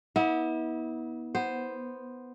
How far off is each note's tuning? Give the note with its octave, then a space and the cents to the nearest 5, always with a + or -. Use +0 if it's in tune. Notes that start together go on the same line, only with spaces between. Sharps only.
B3 -25 E4 -45
B3 +0 C5 +0